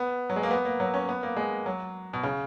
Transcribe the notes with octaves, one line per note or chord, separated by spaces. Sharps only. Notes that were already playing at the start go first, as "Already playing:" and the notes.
Already playing: B3
F#3
G#3
A#3
B3
A#3
F#3
C#4
B3
A#3
G#3
F#3
B2
C#3